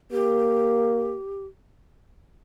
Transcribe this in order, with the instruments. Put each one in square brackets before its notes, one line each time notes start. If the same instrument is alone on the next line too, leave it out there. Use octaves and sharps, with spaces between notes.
[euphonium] A#3 [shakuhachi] G4